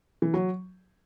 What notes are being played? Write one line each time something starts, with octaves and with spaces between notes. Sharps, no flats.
E3
F#3